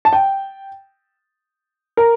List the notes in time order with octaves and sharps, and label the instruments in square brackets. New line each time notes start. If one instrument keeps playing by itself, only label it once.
[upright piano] A5
G5
A#4